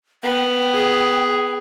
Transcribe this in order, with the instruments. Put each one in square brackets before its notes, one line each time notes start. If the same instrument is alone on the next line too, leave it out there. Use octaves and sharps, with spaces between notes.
[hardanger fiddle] B3 [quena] G5
[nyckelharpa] G#4